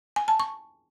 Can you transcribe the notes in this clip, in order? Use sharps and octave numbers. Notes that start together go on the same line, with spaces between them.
G#5
A5
C#6